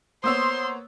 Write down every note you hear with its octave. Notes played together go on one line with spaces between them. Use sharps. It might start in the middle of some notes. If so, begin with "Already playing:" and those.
A#3 B3 C5 C#5 C6 D#6 E6